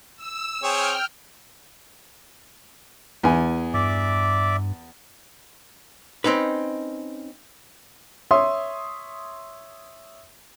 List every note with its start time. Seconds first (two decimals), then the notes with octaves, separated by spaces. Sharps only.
0.17 E6
0.63 C4 G#4 C#5 G5 F6
3.23 E2 G#5
3.74 G2 D5 E5 D6
6.24 C4 C#4 D#4 B4
8.31 C#5 E5 C6 D#6